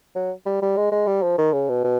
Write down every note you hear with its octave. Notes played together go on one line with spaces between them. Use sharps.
F#3
G3
G3
G#3
G#3
G3
F3
D#3
C#3
B2
B2